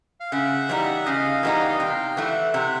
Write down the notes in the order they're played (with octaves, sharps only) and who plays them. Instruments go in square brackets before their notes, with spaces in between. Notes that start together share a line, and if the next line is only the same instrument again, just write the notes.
[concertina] F5
[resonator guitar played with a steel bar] C#3 [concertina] E5 F#5
[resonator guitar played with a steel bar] E3 G3 B3 D#4
[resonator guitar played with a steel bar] C#3 [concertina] D#5 F5
[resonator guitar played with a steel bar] E3 G3 B3 D#4
[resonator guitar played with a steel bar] C3 [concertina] F5 G5
[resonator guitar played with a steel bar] E3 A3 [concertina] E5 F#5
[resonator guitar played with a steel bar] C3 [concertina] E5 F#5